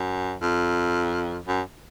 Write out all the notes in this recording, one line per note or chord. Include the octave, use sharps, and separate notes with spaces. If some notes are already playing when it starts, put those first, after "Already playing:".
Already playing: F#2
F2
F#2